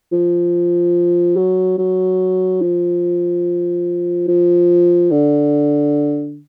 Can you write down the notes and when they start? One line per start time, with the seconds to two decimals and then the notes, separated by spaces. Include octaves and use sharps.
0.12 F3
1.37 F#3
1.78 F#3
2.62 F3
4.28 F3
5.11 D3